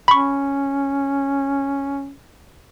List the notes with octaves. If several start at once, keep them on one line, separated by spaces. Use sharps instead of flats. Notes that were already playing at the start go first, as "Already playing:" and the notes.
C#4 B5 C#6